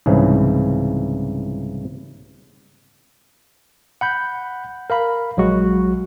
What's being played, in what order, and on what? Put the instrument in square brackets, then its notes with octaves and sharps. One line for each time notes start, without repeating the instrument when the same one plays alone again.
[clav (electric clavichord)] C2 G#2 C#3 E3
[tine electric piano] F#5 B5 G6
A#4 F5 B5
A#1 F#3 G#3 F#4